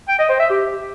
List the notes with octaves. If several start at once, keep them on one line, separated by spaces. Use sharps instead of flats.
G5
D#5
C5
E5
G4